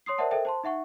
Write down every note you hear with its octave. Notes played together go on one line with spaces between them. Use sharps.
C#5 C6 D#6 C7
A#4 C5 D5 E5 F#5 A5
A4 A#4 C5 D#5 E5 G5
C5 A5 C6
D#4 E5 F#5 C#6